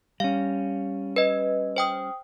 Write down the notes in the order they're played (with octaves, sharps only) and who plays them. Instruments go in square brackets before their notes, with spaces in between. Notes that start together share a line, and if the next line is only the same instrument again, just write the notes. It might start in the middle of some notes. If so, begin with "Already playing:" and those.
[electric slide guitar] G3 C#4 [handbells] F5
[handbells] B4 D#5
C5 G5 D#6